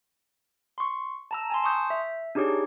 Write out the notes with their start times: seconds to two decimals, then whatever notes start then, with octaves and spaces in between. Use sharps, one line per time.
0.78 C6 C#6
1.31 A5 A#5 E6
1.50 G#5 A5 C6
1.64 C6 C#6 D#6 G6
1.90 E5
2.35 D4 D#4 G4 G#4 C#5